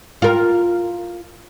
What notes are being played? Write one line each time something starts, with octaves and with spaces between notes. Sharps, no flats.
F4 A#4